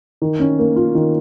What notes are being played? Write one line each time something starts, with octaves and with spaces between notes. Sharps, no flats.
D#3
C#4
A#3
F4
D#3